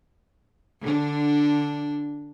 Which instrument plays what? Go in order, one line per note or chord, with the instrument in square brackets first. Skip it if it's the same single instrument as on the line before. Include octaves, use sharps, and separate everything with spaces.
[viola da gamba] D3 D4